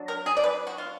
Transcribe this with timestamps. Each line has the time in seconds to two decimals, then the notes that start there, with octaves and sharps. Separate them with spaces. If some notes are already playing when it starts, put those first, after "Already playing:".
Already playing: F#3 D4
0.08 A#4
0.26 G#4
0.37 D5
0.44 B4
0.67 F#4
0.78 F4